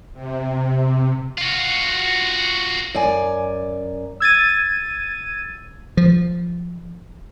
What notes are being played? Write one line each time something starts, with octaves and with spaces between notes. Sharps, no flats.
C3
F4 F#4
F#2 D5 G#5
E6 G#6 A6 D#7
F3